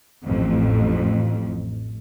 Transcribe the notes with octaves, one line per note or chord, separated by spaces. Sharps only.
A1 F2